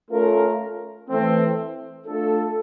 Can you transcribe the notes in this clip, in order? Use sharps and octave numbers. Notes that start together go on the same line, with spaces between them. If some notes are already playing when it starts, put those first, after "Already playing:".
A3 C#4 F4 A#4
E3 A3 C4
A3 D4 F4 A4